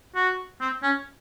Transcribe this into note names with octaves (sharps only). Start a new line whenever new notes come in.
F#4
C4
C#4